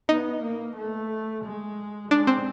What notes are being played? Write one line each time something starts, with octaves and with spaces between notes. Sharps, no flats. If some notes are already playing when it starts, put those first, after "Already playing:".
B3 D#4
A#3
A3
G#3
G#3 D4
C4